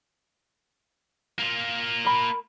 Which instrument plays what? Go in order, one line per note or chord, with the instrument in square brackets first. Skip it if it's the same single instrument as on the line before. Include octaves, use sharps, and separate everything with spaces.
[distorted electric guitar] A#3 F4
[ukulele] A#4 B5